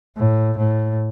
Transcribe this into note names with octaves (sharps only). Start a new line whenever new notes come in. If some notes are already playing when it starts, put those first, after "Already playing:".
A2
A2